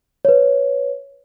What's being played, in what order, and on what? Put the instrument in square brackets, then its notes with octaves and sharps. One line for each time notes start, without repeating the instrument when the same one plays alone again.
[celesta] B4 C#5